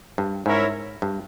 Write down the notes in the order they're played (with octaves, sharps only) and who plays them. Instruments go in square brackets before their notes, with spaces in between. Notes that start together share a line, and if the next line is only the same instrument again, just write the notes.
[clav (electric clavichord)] G2
[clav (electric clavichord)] G#2 [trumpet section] C#4 E4 A#4 C#5 E5
[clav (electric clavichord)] G2